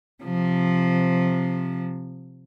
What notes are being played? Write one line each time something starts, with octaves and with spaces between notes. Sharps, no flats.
C3 F3